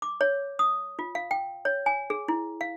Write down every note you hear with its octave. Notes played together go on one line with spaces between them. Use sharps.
D6
C#5
D#6
F4
F5
G5
C#5
G#5
G#4
E4
F5